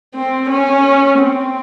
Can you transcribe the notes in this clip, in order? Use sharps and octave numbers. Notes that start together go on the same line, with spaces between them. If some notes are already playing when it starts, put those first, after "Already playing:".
C4
C#4
C4